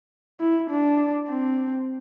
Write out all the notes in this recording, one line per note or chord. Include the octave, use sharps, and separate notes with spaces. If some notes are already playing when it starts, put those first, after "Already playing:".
E4
D4
C4